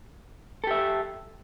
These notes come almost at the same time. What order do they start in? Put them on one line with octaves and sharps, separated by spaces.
A4 G4 E5